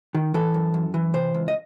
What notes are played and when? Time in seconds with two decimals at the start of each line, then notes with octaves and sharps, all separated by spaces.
0.15 D#3
0.34 E3 A4
0.54 F#2
0.74 F#2
0.94 E3
1.14 C3 C5
1.34 C#2
1.48 D#5